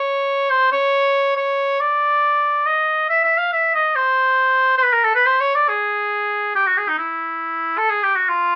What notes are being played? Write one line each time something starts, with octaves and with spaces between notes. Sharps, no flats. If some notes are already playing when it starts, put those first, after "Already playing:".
Already playing: C#5
C5
C#5
C#5
D5
D#5
E5
E5
F5
E5
D#5
C5
C5
B4
A#4
A4
B4
C5
C#5
D5
G#4
G4
F#4
G#4
D#4
E4
A4
G#4
G4
F#4
F4